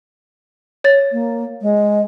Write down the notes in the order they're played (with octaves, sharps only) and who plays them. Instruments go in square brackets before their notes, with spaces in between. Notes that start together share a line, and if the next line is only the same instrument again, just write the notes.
[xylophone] C#5 A6
[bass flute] A#3
G#3